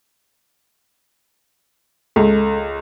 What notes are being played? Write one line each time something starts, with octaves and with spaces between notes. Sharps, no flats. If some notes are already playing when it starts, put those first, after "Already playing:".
C#2 A4